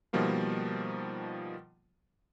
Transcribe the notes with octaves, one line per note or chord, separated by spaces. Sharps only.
B2 D#3 F3 G3 A#3 F4